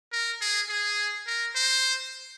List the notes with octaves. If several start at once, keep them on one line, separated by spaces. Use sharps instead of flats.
A#4
G#4
G#4
A#4
C5